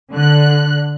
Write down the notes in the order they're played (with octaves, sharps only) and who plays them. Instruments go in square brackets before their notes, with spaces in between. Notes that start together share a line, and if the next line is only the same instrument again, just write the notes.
[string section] D3 F#6